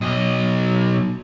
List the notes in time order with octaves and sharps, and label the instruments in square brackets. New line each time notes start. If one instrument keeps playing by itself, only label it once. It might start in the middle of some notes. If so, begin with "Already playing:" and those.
[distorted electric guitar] B1 D#5